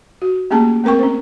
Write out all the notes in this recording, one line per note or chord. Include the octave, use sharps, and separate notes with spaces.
F#4
A3 A#3 C#4 G4 G#4 A5
A3 C4 A#4 G5 C#6
C#4 C5